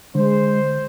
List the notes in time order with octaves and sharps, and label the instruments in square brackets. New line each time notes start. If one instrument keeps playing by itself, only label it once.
[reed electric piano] D3 [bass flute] G#3 [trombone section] C5